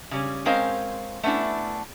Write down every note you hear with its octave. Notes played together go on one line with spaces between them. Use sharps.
C#3 G3 C#4
G#3 C4 C#4 A#4 C5 F5
A3 B3 C#4 D4 E4